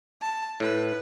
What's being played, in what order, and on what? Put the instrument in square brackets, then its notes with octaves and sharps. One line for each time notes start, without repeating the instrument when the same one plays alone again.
[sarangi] A5
[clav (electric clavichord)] A2 [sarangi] B4